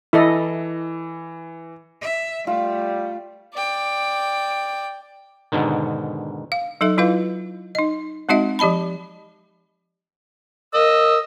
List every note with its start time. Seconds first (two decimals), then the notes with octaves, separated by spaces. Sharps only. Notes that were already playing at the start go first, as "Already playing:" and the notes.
0.13 E3 E4 A4 D#5
2.01 E5
2.47 G3 A3 F4
3.54 D5 G5
5.52 G#2 B2 D3 D#3
6.52 F5
6.81 F#3 D#4 A4 E5
6.98 F#3 E4 F4 B4 F5
7.75 D#4 D#5
8.29 G#3 C4 D#4 F#4 D#5 E5
8.59 F3 G4 D#5 A5 B5
10.74 A#4 D#5 E6